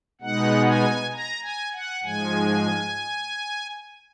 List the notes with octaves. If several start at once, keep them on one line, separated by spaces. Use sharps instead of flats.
B2 G#3 B3 D#4 F#5
G#5
A#5
G#5
F#5
G#2 F3 G#3 G#5